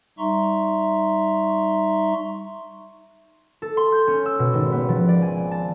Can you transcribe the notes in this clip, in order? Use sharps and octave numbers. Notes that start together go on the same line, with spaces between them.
G3 D#4 E5 A#5 C6 C#6
A4
C6
G6
C#4
E6
B2
G#1
B3
F3
D5
G#5
A5